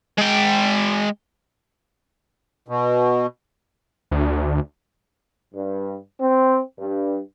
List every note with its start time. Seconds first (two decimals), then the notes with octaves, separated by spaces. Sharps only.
0.18 G#3 G5
2.68 B2
4.11 D2
5.55 G2
6.20 C4
6.78 G2